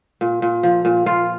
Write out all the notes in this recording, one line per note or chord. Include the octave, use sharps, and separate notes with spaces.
A#2
A#2
F3
A#2
A#2 F4